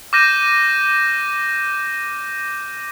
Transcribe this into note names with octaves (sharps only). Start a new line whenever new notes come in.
D6 F6 G6 A#6 D#7 E7